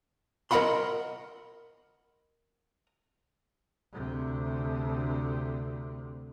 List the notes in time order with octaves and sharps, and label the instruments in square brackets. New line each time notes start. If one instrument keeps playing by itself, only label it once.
[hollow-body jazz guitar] A#4 D#5 E5 F#5 B5 C6
[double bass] D2 C3